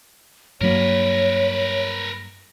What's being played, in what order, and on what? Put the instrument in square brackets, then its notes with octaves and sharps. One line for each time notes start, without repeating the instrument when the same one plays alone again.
[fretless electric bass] G2 F#3 A#3 [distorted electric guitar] A#4 B4 [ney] C#5